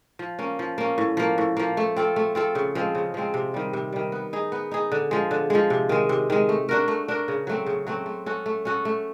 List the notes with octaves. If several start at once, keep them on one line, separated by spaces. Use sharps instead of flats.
F3
A#3 C#4
F3
A#3 C#4
A2
F3 A#3
A2
F3 A#3
A3
C4 F4 A4
A3
C4 F4 A4
C#3
F3 G#3 C4
C#3
F3 G#3 C4
C3
D#3 G3
C3
D#3 G3
B3
D#4 G#4
B3
D#4 G#4
D3
F3 G#3
D3
F3 G#3
C3
D#3 G#3
C3
D#3 G#3
A3
D4 F#4 A#4
A3
D4 F#4 A#4
C#3
F#3 A3 C4
C#3
F#3 A3 C4
A3
C#4 F#4 A4
A3
C#4 F#4 A4
A3